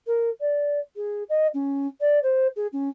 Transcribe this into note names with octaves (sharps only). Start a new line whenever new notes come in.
A#4
D5
G#4
D#5
C#4
D5
C5
G#4
C#4